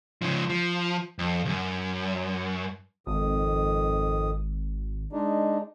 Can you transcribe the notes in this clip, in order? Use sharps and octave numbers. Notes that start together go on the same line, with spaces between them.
C#3 F3
F3
F2
C#2 F#2
G#1 F2 D#3 D#6
G#3 D4 D#4